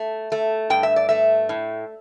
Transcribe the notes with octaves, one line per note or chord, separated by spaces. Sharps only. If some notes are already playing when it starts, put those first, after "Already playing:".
Already playing: A3
A3
G2 G5
E5
D5
A3 E5
A2